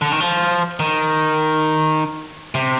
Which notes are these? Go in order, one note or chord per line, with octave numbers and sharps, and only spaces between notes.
D3
D#3
F3
D#3
C3